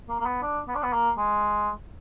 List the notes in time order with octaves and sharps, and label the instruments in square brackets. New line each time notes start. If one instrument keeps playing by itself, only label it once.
[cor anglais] A#3
A#3
B3
D4
B3
D4
B3
A#3
G#3